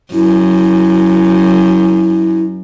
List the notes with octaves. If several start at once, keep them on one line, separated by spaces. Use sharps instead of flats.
F#2 E4